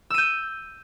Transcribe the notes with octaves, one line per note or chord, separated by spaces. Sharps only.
E6 G6 D#7